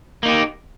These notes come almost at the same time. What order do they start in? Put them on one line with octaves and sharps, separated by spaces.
A#3 D#4 G4